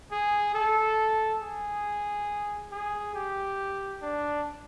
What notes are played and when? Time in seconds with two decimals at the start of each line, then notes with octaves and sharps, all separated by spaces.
0.12 G#4
0.55 A4
1.42 G#4
2.72 G#4
3.15 G4
4.02 D4